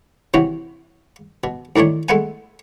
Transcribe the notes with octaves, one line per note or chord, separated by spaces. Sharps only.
C3 E3 C#4 F#4
B2
D2 D#3 E3 D4 C#5
G#3 A3 B3 F#5 G#5